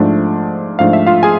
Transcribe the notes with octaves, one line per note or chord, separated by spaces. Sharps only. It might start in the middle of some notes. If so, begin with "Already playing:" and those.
Already playing: G#2 F3 A3 D4
G#2 F3 A3 D4 F5
E5
F4 F5
G#4 G#5